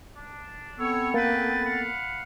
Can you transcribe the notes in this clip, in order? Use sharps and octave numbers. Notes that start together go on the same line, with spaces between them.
D4
B3 C4 A4 C#5 E6
A#3 G#4 B4 G5 A6
F5 F#5 B5